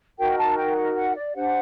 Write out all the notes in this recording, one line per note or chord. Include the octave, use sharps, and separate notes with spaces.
D#4 F#4 A#4 G5
A5
G5
F#5
F#5
D5
D4 G4 C5 F#5